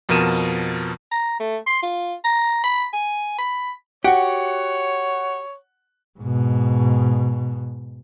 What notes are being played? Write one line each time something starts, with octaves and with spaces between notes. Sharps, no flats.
F2 B2 F3 A#4 D#7 E7
A#5
A3
C6
F4
A#5
B5
G#5
B5
F#4 G4 C#5 F#5
G#2 B2